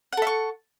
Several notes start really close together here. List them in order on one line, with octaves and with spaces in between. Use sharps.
F#5 A4 E5 C#6